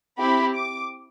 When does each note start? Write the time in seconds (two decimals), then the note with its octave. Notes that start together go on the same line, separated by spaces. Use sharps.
0.18 C4 E4 G4 B5
0.55 D6